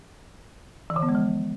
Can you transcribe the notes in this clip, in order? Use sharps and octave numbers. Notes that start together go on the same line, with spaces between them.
E3
D3
B3
G#3
F3